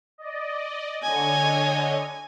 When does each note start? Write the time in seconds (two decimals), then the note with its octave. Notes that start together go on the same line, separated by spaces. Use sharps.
0.18 D5 D#5
1.03 D3 C#5 D#5 G#5